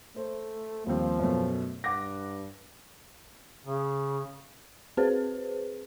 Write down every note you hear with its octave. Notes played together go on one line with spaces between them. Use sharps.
A3 C5
D#2 F3 G3 C4
F#2 B2 A3
G2 F#5 D6 A#6
C#3
C4 G#4 B4 C5